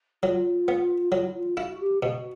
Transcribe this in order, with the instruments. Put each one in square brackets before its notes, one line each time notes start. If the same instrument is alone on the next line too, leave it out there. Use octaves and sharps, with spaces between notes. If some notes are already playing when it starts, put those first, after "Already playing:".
[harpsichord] F#3 [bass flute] F4
[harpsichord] B3
[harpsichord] F#3 [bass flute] F4
[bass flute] E4
F4
[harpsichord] E4 [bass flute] F#4
[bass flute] G4
[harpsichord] B2 [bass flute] F#4